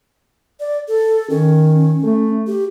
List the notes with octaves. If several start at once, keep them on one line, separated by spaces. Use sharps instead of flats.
D5
A4
D#3 C#4
A3
G4